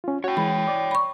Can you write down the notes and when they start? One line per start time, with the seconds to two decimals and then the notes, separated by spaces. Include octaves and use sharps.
0.04 C#4 F4
0.24 F#4 C#5 G5
0.37 E3 G#3 B5
0.68 D5 D6
0.91 B5 C#6